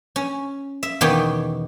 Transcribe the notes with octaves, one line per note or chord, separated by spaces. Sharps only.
C#4
E5
E2 B2 D#3 B3 G4 C#5